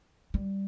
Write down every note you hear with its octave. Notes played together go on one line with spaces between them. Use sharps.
G3